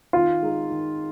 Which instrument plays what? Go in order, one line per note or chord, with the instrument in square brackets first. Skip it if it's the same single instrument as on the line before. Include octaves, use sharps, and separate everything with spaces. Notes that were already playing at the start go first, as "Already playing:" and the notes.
[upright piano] D#3 [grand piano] F4
[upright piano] G#3 D#4 G#4
D#3